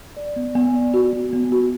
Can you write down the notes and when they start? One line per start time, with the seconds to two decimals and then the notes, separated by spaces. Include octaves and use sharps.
0.17 D5
0.36 B3
0.55 B3
0.75 D5
0.94 F#4
1.13 B3
1.33 B3
1.52 F#4